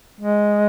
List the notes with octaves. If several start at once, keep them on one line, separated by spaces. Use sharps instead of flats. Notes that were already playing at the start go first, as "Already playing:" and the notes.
G#3